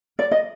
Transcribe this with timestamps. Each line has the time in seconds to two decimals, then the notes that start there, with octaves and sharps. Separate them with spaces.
0.19 D5
0.31 D#5